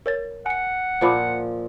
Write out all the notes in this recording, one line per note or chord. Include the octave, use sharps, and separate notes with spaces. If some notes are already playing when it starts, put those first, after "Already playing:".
A#4 C#5 A6
F#5 G#5 C#7
A#2 F3 C5 B5 D6